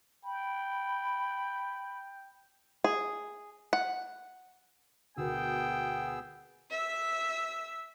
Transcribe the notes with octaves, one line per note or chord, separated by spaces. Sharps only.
G5 B5
G#4
F#5
D2 B2 B3 G#4 A#4 G5 E6
E5 E6